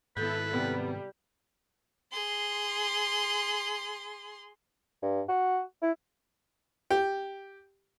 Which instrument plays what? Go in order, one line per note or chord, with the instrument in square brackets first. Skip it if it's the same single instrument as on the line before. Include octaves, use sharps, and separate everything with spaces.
[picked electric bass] G#2 D#3 [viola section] B3 E4 A4 [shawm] B4 [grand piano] G6
[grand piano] C3 B3 [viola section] G3
[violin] G#4 C6
[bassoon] G2
F#4
E4
[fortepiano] G4